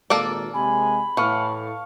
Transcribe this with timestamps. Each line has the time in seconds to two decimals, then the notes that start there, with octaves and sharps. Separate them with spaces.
0.10 G#1 A#2 A#3 A4 D5
0.54 C3 G#3 G#5 B5
1.17 A2 E3 F5 A5 C#6